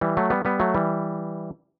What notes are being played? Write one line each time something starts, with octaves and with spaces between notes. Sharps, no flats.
E3 G3
F#3 A3
G3 B3
G3 B3
F#3 A3
E3 G3